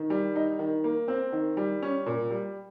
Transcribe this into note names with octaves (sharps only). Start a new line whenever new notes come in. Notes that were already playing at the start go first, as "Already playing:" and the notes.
Already playing: D#3
G3
D#4
D#3
A#3
C4
D#3
G3
C#4
A#2
G3